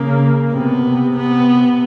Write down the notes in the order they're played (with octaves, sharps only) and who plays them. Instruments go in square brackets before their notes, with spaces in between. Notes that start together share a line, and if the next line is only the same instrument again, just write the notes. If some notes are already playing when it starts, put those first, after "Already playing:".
Already playing: [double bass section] C#3 [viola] A#3
[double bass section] C3 [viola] B3
[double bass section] C3
[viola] B3